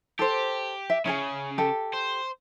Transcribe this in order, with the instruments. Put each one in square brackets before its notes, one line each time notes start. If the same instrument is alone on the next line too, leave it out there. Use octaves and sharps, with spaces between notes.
[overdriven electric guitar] G4 [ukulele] A4 C5
[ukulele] E5
[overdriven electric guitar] C#3 [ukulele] C#4 G#4 G#5
[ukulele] G4 A4
[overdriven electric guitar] C5